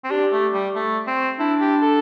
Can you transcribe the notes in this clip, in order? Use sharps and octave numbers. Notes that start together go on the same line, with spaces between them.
C4
D4 G4
A3
G3
A3
C4
D4 E4
G4
A4